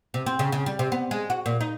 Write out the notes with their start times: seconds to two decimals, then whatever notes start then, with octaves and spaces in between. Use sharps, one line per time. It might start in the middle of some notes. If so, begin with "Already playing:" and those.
0.14 C3
0.26 C4
0.39 C#3
0.52 C#3
0.66 G3
0.79 C3
0.92 B3
1.11 G#3
1.30 F#4
1.46 A#2
1.61 D#4